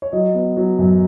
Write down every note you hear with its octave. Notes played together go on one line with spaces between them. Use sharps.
C#5
F#3 D#5
B3
F#3
F#2